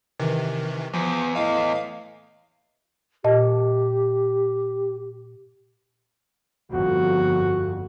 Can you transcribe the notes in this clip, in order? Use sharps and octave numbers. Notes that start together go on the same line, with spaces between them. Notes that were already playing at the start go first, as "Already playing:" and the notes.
C3 D#3 E3
E2 F3 B3
A2 E3 D#5 F5
A#2 G4 D#5 A5
G1 F2 F#4